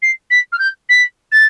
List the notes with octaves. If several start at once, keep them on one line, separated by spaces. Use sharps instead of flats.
C7
B6
F6
G6
B6
A6